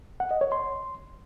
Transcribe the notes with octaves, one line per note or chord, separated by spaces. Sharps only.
F#5
D#5
C#5
C6